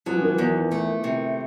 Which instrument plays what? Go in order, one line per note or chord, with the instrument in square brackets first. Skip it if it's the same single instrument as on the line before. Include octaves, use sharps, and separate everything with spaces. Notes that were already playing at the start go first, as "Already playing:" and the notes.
[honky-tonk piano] F3 [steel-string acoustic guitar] F#3
[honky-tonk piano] E3
D#3
E3
[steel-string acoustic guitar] E2
A3
C3